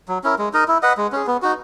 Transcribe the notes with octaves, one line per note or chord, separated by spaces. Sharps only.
F#3
C#4 E4 A#4
G#3
D#4 A#4 D#5
E4
B4 D#5 F#5
G#3
C#4 G#4
B3
D#4 F#4